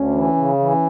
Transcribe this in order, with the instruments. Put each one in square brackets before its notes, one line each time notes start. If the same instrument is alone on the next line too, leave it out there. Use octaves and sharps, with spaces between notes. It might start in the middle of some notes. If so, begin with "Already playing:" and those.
Already playing: [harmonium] D2 [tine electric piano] C#4
[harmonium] E3
C#3
E3